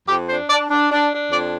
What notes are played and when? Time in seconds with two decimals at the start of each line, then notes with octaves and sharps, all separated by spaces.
0.08 F2 G4
0.28 D4 C5
0.49 D4 D5
0.71 D4
0.91 D4
1.12 D4
1.31 F2 D5